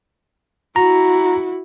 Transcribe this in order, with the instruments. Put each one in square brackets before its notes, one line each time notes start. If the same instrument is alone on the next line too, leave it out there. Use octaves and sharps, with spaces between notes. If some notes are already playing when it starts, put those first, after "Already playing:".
[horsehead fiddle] E4 F#4 [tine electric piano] A#5